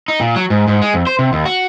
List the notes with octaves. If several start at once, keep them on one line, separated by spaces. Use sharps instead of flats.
D#4
A#2
F#3
G#2
G#2
G#3
F2
C5
C3
D#2
F#4